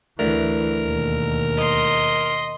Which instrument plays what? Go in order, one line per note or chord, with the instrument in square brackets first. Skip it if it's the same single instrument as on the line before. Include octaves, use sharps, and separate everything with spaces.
[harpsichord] D2 [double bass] E3 [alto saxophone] A#4
[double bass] D#2 B2
[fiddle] D#5 C6